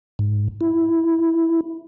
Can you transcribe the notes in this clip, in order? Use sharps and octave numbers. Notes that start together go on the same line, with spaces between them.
G#2
E4